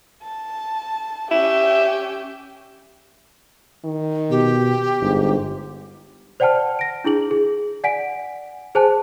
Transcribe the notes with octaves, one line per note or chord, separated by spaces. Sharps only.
A5
C#4 G4 E5
D#3
B2 G4
G1 G#2
C5 D5 F#5 G5 A5 F6
A#6 D7
D4 E4 G#4 F#7
G#4
D5 F#5 G#5 B6 D7
G#4 C5 G#5 A5 F#6